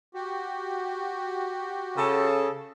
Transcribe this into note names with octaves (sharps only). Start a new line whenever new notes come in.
F#4 G4
C#3 A4